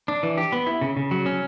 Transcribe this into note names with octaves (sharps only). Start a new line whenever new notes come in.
D4
E3
G4
B3
E4
C#3
C#3
F#3
C#4